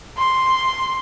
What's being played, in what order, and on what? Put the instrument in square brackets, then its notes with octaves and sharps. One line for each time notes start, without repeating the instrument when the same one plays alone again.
[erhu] C6